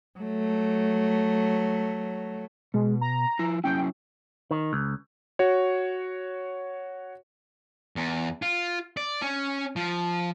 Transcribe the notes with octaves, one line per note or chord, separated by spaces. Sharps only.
F#3 A3
B2 G#3
A#5
F3 E4
F#3 C#4 E4 G5
D#3
C#2
F#4 C#5
E2
F4
D5
C#4
F3